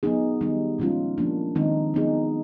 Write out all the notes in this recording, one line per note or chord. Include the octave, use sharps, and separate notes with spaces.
F#3 B3 D#4 G#4
D#3 G3 B3 D#4
A#2 F3 G#3 C#4 F4
F3 A#3 D4
D#3 G#3 C4 D#4
F#3 B3 D#4 G#4